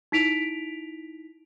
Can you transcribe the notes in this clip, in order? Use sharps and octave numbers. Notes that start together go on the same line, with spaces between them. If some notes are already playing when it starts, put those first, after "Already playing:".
D#4 E4 B6 D7 F7